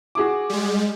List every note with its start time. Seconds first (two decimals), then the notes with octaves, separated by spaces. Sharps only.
0.15 F#4 G#4 D6
0.50 G3 G#3